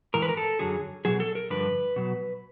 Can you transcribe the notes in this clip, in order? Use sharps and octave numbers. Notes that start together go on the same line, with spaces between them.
G#2 E3 A#4
B4
A#4
A4
F#2 D3 F#3 G#4
B2 F#3 G#4
A4
A#4
G2 D3 F3 B4
B2 F#3